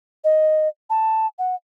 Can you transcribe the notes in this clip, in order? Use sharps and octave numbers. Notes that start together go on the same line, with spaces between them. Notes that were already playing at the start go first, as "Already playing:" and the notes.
D#5
A5
F#5